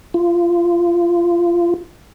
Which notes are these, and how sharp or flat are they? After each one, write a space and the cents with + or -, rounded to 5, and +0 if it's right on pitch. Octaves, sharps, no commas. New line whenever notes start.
F4 -20